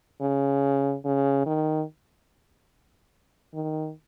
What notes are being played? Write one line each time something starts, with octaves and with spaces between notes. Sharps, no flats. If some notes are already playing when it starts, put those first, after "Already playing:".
C#3
C#3
D#3
D#3